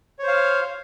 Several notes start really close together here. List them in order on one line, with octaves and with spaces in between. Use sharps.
C#5 C5 F5